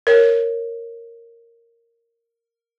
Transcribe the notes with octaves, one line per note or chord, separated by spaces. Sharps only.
A#4 C#5